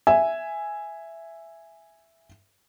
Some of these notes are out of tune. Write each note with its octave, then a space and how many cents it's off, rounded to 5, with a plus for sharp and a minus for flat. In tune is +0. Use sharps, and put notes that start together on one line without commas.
E5 +5 G#5 +0